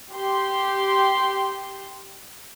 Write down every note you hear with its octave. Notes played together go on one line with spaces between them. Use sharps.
G4 C6